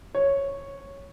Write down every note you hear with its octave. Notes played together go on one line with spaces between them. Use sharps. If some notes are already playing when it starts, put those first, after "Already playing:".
C#5